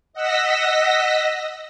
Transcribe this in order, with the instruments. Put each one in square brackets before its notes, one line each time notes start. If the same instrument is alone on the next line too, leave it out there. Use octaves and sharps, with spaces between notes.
[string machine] D#5 F#5 E6 A#6 B6